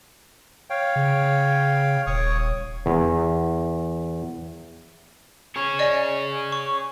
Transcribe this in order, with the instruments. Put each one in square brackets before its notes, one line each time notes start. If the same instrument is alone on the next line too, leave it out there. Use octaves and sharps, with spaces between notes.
[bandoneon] C#5 F5 G5
[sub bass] C#3
[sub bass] D#1 [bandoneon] C#5 C#6 D#6
[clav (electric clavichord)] E2
[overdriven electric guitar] G#4 C#5
[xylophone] D5 D#5 G#5
C#6